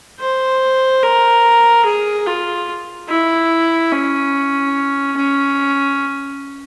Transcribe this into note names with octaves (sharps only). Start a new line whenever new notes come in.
C5
A#4
G#4
F4
E4
C#4
C#4